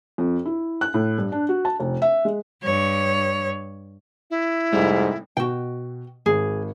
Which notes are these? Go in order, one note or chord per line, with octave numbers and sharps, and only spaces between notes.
F2
E4
F#6
A2
G2
D4
F#4
A5
F1
E5
G#3
G2 C#5
E4
F1 G#2 G3
B2 F#4 G5
G#1 G#4